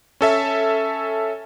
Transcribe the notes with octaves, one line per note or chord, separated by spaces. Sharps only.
C#4 A4 E5